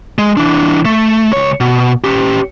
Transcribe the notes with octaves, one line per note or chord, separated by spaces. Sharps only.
G#3
E3 D4
A3
C#2 C#5
B2
C#4 G4